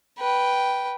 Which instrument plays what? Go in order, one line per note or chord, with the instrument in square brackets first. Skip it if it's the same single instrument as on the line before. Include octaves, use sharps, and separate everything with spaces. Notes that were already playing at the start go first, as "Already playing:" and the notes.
[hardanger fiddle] B4 G5